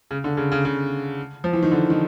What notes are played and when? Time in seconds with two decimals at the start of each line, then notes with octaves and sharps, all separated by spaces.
0.11 C#3
0.24 D3
0.37 C#3
0.52 C#3
0.65 C#3
1.44 F3
1.53 E3
1.63 D#3
1.72 D3
1.90 D#3